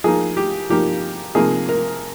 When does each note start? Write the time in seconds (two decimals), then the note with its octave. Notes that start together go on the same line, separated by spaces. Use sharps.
0.04 F3 A#3 D#4 G#4
0.37 G4
0.70 F3 A#3 D#4 G4
1.35 C3 F3 A#3 D#4 G#4
1.69 A#4